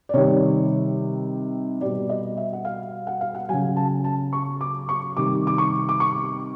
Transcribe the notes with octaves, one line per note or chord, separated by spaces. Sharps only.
D5
C3 D#3 G3 C#5
B2 G3 D5
D#5
E5
F#5
F5
F#5
F5
F#5
C#3 F#3 G#5
A5
A5
C#6
D6
C#6
C3 D#3 G3 D6
D6
C#6
D6
C#6